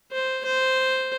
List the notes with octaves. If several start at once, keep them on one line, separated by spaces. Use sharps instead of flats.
C5
C5